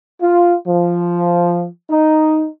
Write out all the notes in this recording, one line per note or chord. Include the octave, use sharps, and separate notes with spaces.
F4
F3
D#4